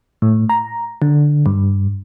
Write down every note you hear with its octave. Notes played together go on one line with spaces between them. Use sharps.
A2
A#5
D3
G2